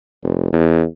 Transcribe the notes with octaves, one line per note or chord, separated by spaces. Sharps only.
F1
E2